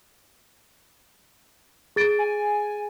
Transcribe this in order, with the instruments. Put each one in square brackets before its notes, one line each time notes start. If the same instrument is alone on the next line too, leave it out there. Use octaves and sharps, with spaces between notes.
[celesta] G#4 A6 D7
[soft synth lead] G#5